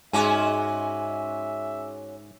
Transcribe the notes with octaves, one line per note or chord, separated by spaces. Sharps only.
G#2 G#3 C#4 F#4 E5 G#5 D6